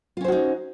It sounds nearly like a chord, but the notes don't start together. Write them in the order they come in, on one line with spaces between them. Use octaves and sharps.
F4 C#4 C5 F#4 D#4